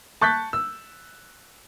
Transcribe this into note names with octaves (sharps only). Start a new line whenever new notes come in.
A5 C#6 F#6 G6 A6 B6
E6